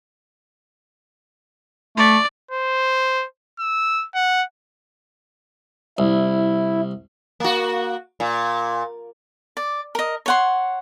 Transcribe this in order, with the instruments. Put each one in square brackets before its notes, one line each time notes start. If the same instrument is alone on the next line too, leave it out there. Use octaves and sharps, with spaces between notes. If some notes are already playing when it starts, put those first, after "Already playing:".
[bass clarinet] A3 [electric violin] D5
[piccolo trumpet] C5
E6
F#5
[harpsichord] C2 [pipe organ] E4
[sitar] A#3 F#4
A#2
[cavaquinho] D5
A#4 D#5
C#5 F#5 C6